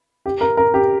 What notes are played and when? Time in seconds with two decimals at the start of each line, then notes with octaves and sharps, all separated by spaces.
0.26 G4
0.41 A#4
0.57 A#4
0.74 G4